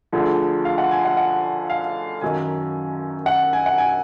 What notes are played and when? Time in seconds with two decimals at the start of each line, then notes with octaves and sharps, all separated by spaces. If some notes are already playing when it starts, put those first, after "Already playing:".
0.12 D2 D3 F3 G#4
0.65 F5
0.78 F#5
0.91 G#5
1.05 F#5
1.17 F#5
1.70 F5
2.21 F#2 D#3 F#3 G#5
3.26 F#5
3.53 G#5
3.66 F#5
3.78 G#5